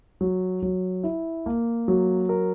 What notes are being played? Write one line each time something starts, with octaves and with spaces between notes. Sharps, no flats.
F#3
F#3
E4
A#3
F#3
A#4